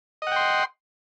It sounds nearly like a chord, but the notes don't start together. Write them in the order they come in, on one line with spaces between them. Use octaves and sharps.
D#5 F#5 G5 C6